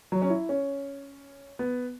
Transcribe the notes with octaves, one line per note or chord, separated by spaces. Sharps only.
F#3
C#4
E4
C#4
B3